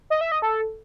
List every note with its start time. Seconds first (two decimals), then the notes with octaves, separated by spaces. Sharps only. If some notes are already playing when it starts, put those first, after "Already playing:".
0.10 D#5
0.21 E5
0.32 D#5
0.42 A4